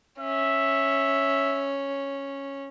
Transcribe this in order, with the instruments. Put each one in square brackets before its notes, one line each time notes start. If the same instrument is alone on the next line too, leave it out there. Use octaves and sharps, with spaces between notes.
[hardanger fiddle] C#4 [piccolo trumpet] E5